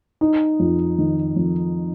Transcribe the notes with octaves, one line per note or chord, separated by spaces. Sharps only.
D#4
F2
D#3
F2